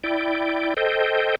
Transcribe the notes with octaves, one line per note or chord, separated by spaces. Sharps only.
E4 D5 G5
A4 C5 D#5 G5